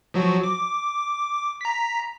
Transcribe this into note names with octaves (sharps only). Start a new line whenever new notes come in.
F3 F#3 F#4
D6
A#5 B6